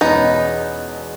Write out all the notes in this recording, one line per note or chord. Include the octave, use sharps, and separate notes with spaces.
E2 B2 G#3 B3 C#4 D#4